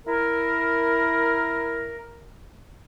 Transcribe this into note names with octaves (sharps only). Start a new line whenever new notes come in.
E4 A#4